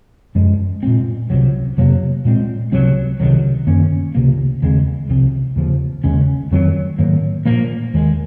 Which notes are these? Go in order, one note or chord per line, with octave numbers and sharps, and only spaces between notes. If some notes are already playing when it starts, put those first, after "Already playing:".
F#2 F3 G#3
A#2 G#3 C4
C#2 C3 F#3
F2 C3 F#3 A#3
A#2 G#3 C4
C#2 C3 F#3 C4
C#2 C3 D#3 F#3
F#2 D#3 A#3 C#4
C#2 C3 F3 A#3
D#2 C#3 G#3 C4
C2 C3 F3 C4
D#2 C#3 F3
D#2 C#3 G#3 C#4
F2 D#3 F#3 C4
G#2 D#3 F#3 A#3
A#2 F3 A#3
D#2 D#3 G#3